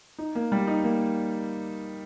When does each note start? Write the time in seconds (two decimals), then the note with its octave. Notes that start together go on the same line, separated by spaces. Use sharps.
0.18 D#4
0.35 A#3
0.52 G3
0.67 D#4
0.84 A#3